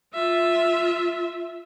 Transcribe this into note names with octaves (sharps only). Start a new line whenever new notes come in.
F4 E5